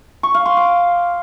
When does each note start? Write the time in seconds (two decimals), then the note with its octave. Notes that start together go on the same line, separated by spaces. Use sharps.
0.23 C#6
0.34 F5
0.46 C6
0.57 D6